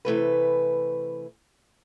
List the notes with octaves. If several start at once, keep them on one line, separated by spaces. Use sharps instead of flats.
C3 E3 A3 B4